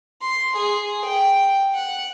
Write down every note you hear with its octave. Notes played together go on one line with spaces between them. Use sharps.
C6
G#4
G5
F#5